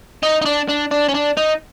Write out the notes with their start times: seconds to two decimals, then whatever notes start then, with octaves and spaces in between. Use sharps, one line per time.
0.23 D#4
0.42 D#4
0.46 D4
0.69 D4
0.91 D4
1.08 C#4
1.14 D4
1.37 D#4